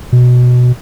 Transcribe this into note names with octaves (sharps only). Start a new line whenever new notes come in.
B2